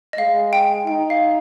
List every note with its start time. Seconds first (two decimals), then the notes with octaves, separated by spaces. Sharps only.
0.13 D#5
0.18 G#3 F5
0.53 G5
0.87 D#4 G5
1.10 F5